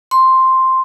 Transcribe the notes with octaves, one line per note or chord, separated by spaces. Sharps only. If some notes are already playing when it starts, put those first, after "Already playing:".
C6